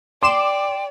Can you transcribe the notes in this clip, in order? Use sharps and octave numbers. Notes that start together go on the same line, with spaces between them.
D5 G5 C6 D6 E7